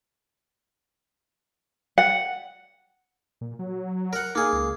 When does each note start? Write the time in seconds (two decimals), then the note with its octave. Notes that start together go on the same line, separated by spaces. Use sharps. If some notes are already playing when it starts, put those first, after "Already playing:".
1.98 F#5
3.41 A#2
3.59 F#3
4.13 A#4 F#5
4.35 A#3 D#4 G#4
4.53 C#2